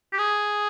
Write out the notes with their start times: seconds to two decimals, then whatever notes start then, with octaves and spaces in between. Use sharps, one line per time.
0.13 G4
0.19 G#4